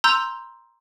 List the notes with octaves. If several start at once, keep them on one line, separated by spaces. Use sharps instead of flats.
A#5 C6 E6 G6 F7